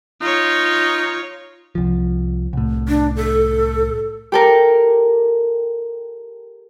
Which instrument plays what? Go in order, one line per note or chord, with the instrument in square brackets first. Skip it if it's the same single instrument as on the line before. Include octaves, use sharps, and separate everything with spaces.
[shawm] D#4 [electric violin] F4 C#5
[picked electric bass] C2 F3
C2 A2
[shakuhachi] D4
A4
[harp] G4 A4 A#4